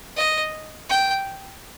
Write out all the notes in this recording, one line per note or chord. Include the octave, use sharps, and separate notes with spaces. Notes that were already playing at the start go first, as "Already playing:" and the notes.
D#5
G5